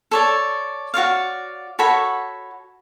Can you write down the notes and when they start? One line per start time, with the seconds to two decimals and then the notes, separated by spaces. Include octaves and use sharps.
0.11 A4 C#5 D5
0.94 F#4 C#5 D5 F5
1.79 F#4 A4 C#5 B5